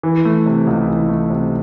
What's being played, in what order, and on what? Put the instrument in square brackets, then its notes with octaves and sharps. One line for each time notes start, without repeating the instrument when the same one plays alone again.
[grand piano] E3
A3
C3
C#2
E3
A3
C3